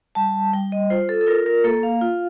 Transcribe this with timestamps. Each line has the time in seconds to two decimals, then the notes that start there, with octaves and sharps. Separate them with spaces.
0.15 G3 A5
0.53 G3 G5
0.72 D#5
0.90 F4 C5
1.09 A4
1.21 A4
1.27 F4 A#4
1.46 A#4
1.64 A#3 A4
1.83 F5
2.01 F4